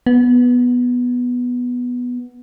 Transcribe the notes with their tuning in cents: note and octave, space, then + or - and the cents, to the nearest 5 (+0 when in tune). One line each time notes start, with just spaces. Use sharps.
B3 -5